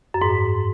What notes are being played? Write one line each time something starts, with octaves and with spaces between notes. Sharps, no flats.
F#2
G#2